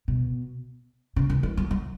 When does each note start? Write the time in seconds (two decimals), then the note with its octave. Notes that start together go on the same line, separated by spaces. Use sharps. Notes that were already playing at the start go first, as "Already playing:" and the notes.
0.08 B2
1.16 C#3
1.30 E3
1.43 E3
1.57 F#3
1.71 F#3